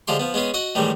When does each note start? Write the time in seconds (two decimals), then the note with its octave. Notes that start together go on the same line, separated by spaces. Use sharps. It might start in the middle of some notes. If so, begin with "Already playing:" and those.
0.07 D3 F3 G#3 G4 C6
0.20 F3 B3
0.34 G#3 B3 C#4 G#4
0.54 F#4 D#5 F#5
0.75 A2 D#3 E3 G3 G#3